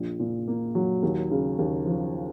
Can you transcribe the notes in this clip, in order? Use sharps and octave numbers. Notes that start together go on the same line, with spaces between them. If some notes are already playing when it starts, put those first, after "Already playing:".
Already playing: A#1
A#2
A#3
F#3
D#2
C#3
D#2
F3